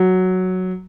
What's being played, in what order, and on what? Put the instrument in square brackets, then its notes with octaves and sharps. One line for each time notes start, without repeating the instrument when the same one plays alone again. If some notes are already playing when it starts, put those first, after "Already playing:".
Already playing: [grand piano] F#3